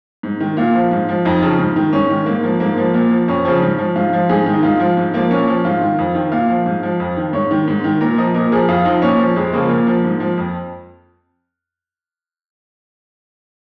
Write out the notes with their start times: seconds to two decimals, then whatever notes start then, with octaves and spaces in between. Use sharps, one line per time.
0.23 G#2
0.40 D#3
0.57 A#2 F4
0.75 F3
0.91 G#2
1.09 F3
1.25 F2 D#4
1.42 C#3 F3
1.59 G#2
1.76 D#3
1.93 G#2 C#4
2.10 D#3
2.26 G#2 A#3
2.43 F3
2.60 G#2 A#3
2.77 F3
2.94 A#2
3.11 F3
3.28 F2 C#4
3.45 C#3 F3
3.62 G#2
3.78 F3
3.96 G#2 F4
4.13 F3
4.29 G#2 G#4
4.46 D#3
4.53 D#4
4.63 G#2 F4
4.80 F3
4.97 G#2
5.14 F3 A#3
5.31 A#2 C#4
5.47 F3
5.65 G#2 F4
5.81 D#3
5.98 F2
6.15 D#3
6.32 A#2 F5
6.49 F3
6.66 G#2
6.83 F3
7.00 F2
7.17 D#3
7.33 G#2 C#5
7.51 D#3
7.68 G#2
7.84 D#3
8.01 A#2 A#4
8.18 F3 D#5
8.34 A#2 A#4
8.52 F3 G#4
8.68 F2 F4
8.85 F3 D#4
9.02 A#2 C#4
9.19 F3
9.36 F2 G#3
9.53 C#3 F3 A#3
9.70 A#2
9.87 F3
10.04 G#2
10.20 F3
10.37 F2